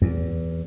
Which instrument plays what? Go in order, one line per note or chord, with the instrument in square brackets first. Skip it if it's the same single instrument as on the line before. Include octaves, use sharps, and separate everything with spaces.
[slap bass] E2